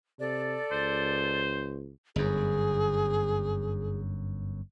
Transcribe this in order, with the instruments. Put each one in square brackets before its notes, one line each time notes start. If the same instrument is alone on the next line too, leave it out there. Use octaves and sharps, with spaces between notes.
[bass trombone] C3 [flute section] A4 D5
[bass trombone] C#2 [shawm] C5
[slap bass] G1 F#2 [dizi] G#4